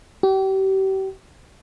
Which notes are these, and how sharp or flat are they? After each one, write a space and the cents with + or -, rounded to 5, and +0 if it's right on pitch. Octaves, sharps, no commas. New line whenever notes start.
G4 -35